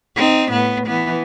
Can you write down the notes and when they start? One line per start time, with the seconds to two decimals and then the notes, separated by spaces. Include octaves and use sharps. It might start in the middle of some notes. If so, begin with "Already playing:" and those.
0.17 C4 D#4
0.52 A2 B3
0.87 E3 B3